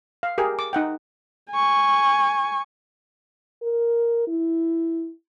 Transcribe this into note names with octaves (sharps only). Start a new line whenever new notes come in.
F5
G4 G#4 A#4
D6
D#4 F#5 G5
G#5 C#6
A#4
E4